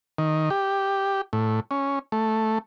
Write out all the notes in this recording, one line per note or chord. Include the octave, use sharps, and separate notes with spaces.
D#3
G4
A2
C#4
A3